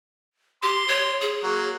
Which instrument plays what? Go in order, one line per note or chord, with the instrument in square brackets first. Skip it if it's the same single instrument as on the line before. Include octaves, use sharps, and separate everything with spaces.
[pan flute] G4 [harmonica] C6
[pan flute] C#5
G#4
[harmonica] F#3 A#3